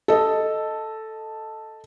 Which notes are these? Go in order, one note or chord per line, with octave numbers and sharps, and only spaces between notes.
A4 D#5